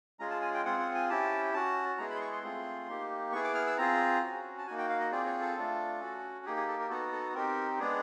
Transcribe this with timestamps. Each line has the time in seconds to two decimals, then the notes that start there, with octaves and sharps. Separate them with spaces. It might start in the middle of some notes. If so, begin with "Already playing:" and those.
0.19 G#3 C#4 F4 G#4 A#5
0.31 A5
0.42 G#5
0.54 G5
0.65 C4 F4 G#4 F#5
0.80 F#5
0.95 G#5
1.10 C#4 E4 G4 A5
1.54 C#4 F#4 A5
1.98 G#3 B3 E4 G#4 A#5
2.10 B5
2.16 C6
2.21 C#6
2.32 C6
2.43 A3 C4 F4 G#4
2.88 A#3 D#4 G4
3.33 B3 E4 G#4 C#6
3.44 D6
3.55 F6
3.67 E6
3.78 C4 F4 G#4 A#5
4.22 C#4 F#4
4.58 A5
4.67 A#3 D#4 F#4 G#5
4.78 G5
4.89 F5
5.00 D#5
5.11 C4 F4 G#4 D5
5.26 C#5
5.41 A4
5.56 A3 D4 F4
6.00 C#4 F#4
6.45 A#3 D#4 G4 G#4
6.57 G#4
6.68 A4
6.80 A#4
6.90 B3 D#4 F#4 A4
7.13 A4
7.34 C4 D#4 G4 A#4
7.79 G#3 B3 D4 G#4